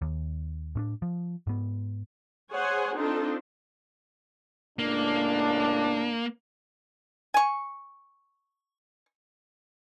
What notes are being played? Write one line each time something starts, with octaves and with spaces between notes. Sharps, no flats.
D#2
A2 C#4 D4
F3
G#2 B3
G#4 C5 C#5 F#5 G#5
C4 D4 D#4 F4 A4 C5
C#2 A2 A#3 D4
G#5 C#6